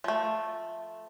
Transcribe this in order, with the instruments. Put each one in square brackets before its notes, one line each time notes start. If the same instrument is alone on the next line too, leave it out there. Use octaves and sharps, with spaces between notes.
[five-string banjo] F3 A3